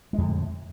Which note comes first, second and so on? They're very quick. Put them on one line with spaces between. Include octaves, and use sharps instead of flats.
G#3 F2 D3 A2